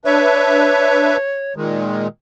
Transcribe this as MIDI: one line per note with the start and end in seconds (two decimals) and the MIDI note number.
0.05 1.17 62
0.05 1.17 71
0.05 1.53 73
0.05 1.17 76
1.56 2.07 46
1.56 2.07 51
1.56 2.07 56